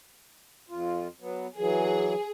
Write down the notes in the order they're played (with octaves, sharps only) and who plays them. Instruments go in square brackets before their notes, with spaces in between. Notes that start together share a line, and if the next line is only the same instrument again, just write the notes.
[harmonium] F2 F4
F#3 B3
[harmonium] E3 F#3 [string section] G#4